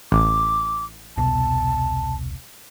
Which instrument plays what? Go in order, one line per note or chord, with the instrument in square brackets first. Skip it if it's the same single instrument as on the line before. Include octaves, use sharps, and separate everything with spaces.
[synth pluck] A1 [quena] D6
[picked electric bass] E1 C2 B2 [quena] A5